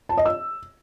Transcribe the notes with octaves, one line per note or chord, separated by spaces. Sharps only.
A5
D#5
E6